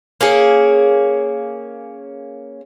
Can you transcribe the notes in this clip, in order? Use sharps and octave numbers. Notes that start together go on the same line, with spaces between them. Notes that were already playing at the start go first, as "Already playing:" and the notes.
A#3 C#4 G#4